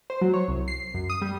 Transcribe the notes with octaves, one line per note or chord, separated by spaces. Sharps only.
C5
F#3
C#5
C2
C7
F#2
D#6
G3